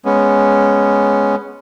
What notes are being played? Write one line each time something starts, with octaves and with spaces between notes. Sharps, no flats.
G#3 B3 C#4